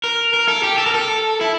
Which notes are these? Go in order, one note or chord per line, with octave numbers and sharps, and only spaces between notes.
A#4
A#4
A4
G4
A4
A#4
A4
E4